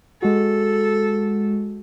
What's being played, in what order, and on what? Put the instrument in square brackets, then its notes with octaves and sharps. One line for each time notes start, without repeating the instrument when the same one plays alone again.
[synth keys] G#3 F#4 [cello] A4